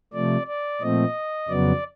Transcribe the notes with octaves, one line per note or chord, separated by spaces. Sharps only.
C3 F3 A3 D5
D5
A#2 F3 A3 C4 D#5
F2 C#3 F#3 B3 D5